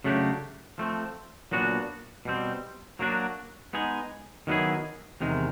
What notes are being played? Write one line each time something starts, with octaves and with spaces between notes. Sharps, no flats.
C#3 F#3 A3 D4 G4
F3 A3 C4
A#2 F#3 B3 D4 F#4
B2 G3 C4
F#3 A#3 D4 F#4
G#3 B3 D#4 G#4
D#3 F#3 B3 E4 G#4
E2 C3 D#3 G#3